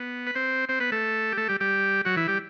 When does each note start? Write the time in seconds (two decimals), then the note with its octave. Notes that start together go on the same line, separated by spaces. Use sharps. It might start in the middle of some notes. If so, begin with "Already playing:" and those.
Already playing: B3
0.27 B4
0.35 C4 C5
0.69 C4 C5
0.80 B3 B4
0.92 A3 A4
1.32 G4
1.37 A3 A4
1.48 G3 G4
1.60 G3 G4
2.05 F#3 F#4
2.16 E3 E4
2.28 G3 G4